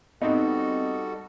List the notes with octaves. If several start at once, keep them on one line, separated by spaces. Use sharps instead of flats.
G3 B3 C4 D#4 F#4 A4